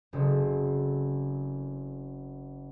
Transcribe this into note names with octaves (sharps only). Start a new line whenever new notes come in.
F#1 C#3 C4 A4